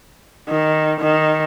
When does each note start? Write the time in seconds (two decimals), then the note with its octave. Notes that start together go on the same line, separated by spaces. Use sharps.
0.50 D#3
1.00 D#3